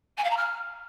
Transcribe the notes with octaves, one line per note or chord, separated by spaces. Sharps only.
G#5
F5
A#5
F6